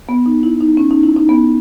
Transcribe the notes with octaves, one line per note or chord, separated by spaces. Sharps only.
B3
D#4
E4
D#4
C#4
D#4
E4
D#4
B3